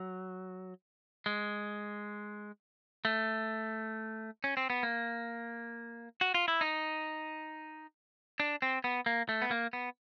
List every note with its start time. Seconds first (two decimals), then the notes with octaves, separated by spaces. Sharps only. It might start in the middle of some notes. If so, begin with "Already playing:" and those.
Already playing: F#3
1.26 G#3
3.05 A3
4.44 C#4
4.57 C4
4.70 B3
4.83 A#3
6.21 F#4
6.34 F4
6.48 E4
6.61 D#4
8.40 D4
8.62 C4
8.84 B3
9.06 A#3
9.29 A3
9.42 B3
9.51 A#3
9.73 B3